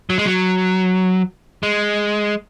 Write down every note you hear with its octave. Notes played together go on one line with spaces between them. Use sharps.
F#3
G#3
F#3
G#3